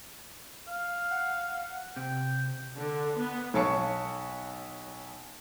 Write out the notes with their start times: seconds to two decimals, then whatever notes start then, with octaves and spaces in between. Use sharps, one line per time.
0.68 F5
1.11 F#5
1.96 C3 G5
2.77 D3
3.16 B3
3.54 B1 C#5 A5 C#6 C#7